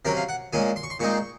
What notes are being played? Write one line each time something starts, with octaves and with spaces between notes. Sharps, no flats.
C3 F#3 C#4 A#4
F5
F#5
A#2 G#3 C#4 G#5
C6
C#6
C6
A#2 G#3 C4 D#4 C#6